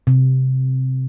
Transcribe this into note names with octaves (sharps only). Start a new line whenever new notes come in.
C3